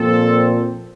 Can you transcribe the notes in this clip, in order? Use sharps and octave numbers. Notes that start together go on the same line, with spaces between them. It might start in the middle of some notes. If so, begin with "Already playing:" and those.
Already playing: A#2 F3 C4 A4